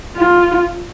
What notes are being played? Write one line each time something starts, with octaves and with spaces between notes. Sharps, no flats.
F4